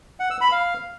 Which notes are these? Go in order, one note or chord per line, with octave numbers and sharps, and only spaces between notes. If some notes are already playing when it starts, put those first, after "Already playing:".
F#5
E6
B5
F5